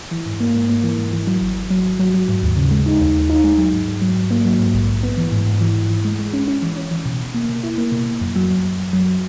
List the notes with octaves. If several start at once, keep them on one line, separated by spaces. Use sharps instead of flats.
E3
G#2
A#3
G#2
A#3
E3
G#2
E3
F#3
G#1
G#1
F#3
G#1
F#3
F#3
G#2
D#2
C#3
G#3
D#4
D#2
D#2
D#4
G#3
F#3
G#2
G#2
F#3
G#2
A#3
F#3
G#2
A#1
A#1
B3
E3
G#2
G#2
E3
G#2
E3
G#3
G#3
C#4
C#4
E3
C#4
E3
B2
B2
A#3
B2
E4
A#3
B2
B2
F#2
F#3
F#2
F#2
F#2
F#3